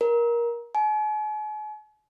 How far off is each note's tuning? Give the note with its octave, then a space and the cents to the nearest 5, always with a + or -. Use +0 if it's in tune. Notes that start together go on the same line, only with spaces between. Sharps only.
A#4 +20
G#5 +45